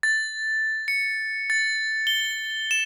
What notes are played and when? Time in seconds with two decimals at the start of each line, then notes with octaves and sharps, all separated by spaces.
0.03 A6
0.88 C#7
1.50 A6
2.07 G7
2.71 E7